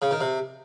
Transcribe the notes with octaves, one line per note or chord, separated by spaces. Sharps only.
C#3
D#3
C3